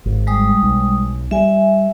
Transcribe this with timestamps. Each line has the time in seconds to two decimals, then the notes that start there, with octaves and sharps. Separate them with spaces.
0.05 G#1
0.27 G3 G#3 D#6
0.63 B1
1.31 G3 E5 G#5